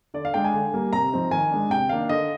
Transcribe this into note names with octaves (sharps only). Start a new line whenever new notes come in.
D3 D5
F5
G#3 D4 G5
G#5
D3
G3 A#3
C3 A#5
F3 C4 D#4
D#3 G#5
G#3 D4
C3 G5
D#3 A#3 D4 F5
D3 D#5